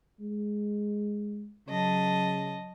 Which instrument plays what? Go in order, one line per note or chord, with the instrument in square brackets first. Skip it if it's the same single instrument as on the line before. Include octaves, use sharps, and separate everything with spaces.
[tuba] G#3
[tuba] C#3 [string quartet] F#3 D#5 A5